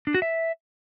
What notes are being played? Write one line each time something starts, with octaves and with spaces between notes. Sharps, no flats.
D4
F#4
E5